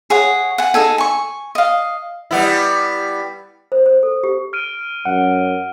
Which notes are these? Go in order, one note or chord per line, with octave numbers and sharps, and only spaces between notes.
G#4 C#5 F#5
F#5 G#5
D#4 G#4 A4 G#5
G#5 C#6
D#5 F5
G3 B3 E4
C5
C5
A4
G4
F6 D7 D#7
F#2 F#5